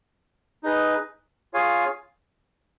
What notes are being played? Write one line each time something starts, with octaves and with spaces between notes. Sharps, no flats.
D#4 G#4 B4 D#5
F4 G#4 C#5 F5 G#5